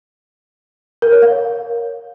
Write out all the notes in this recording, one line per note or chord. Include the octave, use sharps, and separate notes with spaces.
A#4
C#5
F5